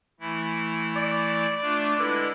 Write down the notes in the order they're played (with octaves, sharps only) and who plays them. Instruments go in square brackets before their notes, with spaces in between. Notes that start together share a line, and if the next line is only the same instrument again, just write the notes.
[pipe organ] E3 A3 E4
[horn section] D5
[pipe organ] A3 D4 F4
[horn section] D3 B4 [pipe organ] G#3 E4